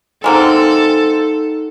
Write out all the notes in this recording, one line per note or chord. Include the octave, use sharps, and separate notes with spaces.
G#3 A#3 C4 D#4 A4 F#5